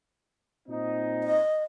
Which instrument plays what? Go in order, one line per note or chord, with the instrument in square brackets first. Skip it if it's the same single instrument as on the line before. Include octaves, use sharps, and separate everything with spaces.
[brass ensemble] A#2 C4 D#4
[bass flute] D#5